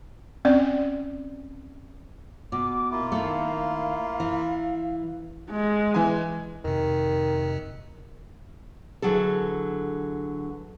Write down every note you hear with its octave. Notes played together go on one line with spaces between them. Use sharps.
C4 C#4 D5
B2 D6
A#3 E4 F4
D#3 A3 F5
E3
G#3
E3 G#5
F2 C3 D#3
D3 E3 F#3 G#4 A4